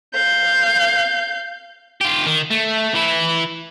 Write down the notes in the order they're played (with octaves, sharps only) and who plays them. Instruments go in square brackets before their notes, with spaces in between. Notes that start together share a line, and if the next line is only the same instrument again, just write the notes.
[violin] F5 G6
[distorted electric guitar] F4 G4
D#3
A3
E3 E4